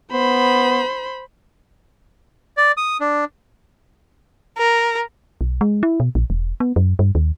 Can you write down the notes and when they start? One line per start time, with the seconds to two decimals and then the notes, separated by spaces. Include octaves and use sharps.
0.12 B3 C5 B5
2.57 D5
2.77 D#6
3.01 D4
4.57 A#4
5.41 B1
5.61 G#3
5.83 E4
6.00 B2
6.15 A#1
6.30 E1
6.60 B3
6.76 F#2
6.99 G2
7.15 D#2